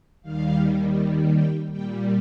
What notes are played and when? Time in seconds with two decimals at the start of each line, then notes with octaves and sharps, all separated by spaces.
0.22 D#2 D#3 G3 F5
1.33 G5
1.71 A#2 G3 G5